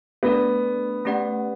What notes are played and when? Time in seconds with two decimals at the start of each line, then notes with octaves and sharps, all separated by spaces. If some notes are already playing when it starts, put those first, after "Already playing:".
0.23 A3 B3 D4 A4 D5
1.05 A3 C#4 G4 D5 F#5